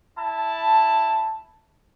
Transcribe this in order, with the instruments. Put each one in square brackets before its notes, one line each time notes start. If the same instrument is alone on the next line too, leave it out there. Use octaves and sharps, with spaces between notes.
[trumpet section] E4 A5